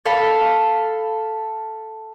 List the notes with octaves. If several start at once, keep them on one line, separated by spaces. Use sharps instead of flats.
A4 F5 B5